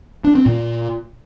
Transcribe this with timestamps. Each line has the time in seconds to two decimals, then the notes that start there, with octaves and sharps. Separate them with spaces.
0.24 D4
0.35 C4
0.46 A#2